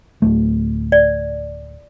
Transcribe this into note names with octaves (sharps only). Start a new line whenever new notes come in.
D1 A3
D5